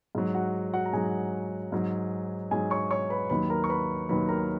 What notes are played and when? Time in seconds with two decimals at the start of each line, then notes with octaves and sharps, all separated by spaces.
0.15 G#2 F#3
0.34 F#4 F#5
0.74 F#4 F#5
0.85 A#5
0.93 G#2 F#3 G#4 G#5
1.72 G#2 F#3
2.51 G#2 F#3 G#4 G#5
2.70 C#5 C#6
2.91 C#5 C#6
3.10 B4 B5
3.30 D#2 D#3 F#3 B4 B5
3.50 A#4 A#5
3.64 C#6
3.69 B4 B5
4.09 D#2 D#3 F#3 B4 B5
4.29 A#4 A#5